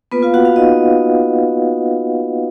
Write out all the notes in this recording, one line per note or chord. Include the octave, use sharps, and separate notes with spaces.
A#3 B3 F4 B4
F4 F5
F#4 F#5
F4 F5
D#4 D#5